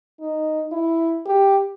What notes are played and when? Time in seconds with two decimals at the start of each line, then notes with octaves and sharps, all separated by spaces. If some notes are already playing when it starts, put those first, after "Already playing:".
0.21 D#4
0.72 E4
1.26 G4